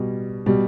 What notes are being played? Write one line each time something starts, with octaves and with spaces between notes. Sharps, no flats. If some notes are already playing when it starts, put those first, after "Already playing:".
Already playing: B2 G3
B2 G3